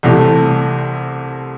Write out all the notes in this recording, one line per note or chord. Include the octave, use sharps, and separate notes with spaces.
C2 C3 E3 A3